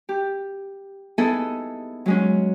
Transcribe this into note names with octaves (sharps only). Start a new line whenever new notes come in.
G4
B3 D#4 E4 G#4 A4
F#3 G#3 C#4